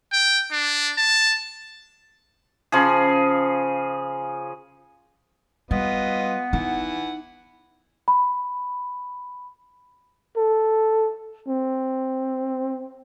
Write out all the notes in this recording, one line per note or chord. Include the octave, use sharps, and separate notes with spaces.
G5
D4
A5
C#3 F3 G#4
G3 B3 F4 B4 D#5
E3 D#4 F#5
B5
A4
C4